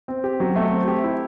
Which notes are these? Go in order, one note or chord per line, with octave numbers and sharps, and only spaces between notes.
C4
G4
F#3
A3
C4
G4
E4